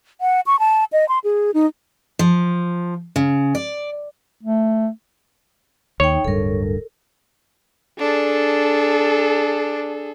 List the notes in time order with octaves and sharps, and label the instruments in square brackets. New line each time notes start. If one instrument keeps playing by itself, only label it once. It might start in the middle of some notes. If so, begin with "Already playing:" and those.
[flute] F#5
C#6
A5
D#5
C6
G#4
D#4
[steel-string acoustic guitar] F3
C#3
D5
[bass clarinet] A3
[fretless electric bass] D#2 [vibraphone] D#4 G5 [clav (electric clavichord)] C#5
[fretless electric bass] D1 G2 [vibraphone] A4 A#4
[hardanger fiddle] D4 [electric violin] G#4 A4